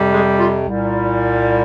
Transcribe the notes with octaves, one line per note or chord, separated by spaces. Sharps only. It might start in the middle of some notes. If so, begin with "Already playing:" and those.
Already playing: F2 C3 G3
G#3 G#4
F4
C2 A#2 G3